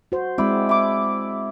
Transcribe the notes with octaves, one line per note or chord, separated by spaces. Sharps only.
F#4 C5
G#3 C4 E4 D5
E4 D6